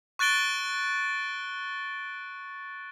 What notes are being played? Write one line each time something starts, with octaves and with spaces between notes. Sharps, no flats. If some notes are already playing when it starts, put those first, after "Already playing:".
C#6 F#6 A6 D7 G7